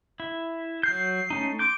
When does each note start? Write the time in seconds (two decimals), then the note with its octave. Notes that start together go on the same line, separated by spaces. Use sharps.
0.20 E4
0.83 F#3 G6 C7
1.30 A3 C#4 D#4
1.59 C6 D6 G6 D7